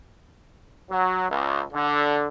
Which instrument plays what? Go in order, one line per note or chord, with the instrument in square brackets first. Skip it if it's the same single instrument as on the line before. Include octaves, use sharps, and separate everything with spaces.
[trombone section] F#3
C#2
D3